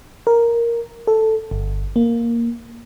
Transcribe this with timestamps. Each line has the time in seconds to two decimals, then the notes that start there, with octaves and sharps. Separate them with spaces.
0.27 A#4
1.07 A4
1.51 G1
1.96 A#3